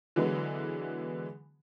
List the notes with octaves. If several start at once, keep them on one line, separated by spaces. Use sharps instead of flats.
D3 E3 F#3 G#3 B3